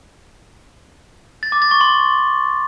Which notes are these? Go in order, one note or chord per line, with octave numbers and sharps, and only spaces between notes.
A6
D6
A6
C#6
C6